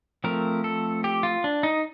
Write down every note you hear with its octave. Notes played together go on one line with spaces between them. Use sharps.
F3 A3 C4 A#4
A4
G4
F4
D4
D#4